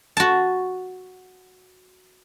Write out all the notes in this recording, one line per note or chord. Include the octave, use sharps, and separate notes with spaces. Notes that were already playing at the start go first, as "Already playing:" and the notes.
F#4 A5